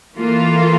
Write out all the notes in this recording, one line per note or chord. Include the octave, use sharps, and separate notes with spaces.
E3 A#3 F4 A4